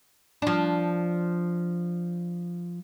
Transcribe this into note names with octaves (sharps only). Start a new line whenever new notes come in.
F3 D4